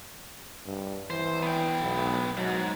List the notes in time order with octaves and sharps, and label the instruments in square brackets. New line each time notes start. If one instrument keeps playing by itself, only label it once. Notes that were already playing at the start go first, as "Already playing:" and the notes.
[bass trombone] G2
[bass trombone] E3 [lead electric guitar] C5
[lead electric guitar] B3 G5
[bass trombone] B1
[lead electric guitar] G#2 [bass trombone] F#3